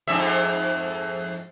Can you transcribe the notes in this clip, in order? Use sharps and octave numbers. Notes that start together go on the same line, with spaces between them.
F2 G#2 E5